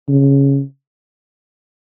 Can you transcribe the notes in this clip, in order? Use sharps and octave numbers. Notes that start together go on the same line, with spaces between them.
C#3